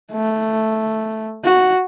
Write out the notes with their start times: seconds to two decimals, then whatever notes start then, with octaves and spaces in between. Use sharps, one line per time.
0.12 A3
1.44 F#4